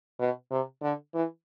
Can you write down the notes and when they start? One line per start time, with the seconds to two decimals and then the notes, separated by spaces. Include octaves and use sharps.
0.19 B2
0.51 C3
0.82 D3
1.14 E3